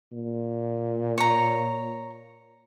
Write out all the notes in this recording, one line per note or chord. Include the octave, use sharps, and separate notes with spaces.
A#2
C#5 A#5